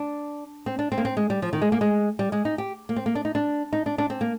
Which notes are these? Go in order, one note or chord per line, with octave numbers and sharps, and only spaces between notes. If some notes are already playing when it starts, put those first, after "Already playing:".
Already playing: D4
C4
D4
C4
A#3
C4
G#3
G3
F3
D#3
G#3
A#3
G#3
G3
G#3
D#4
G4
A#3
C4
A#3
D4
D#4
D4
D#4
D4
D4
C4
A#3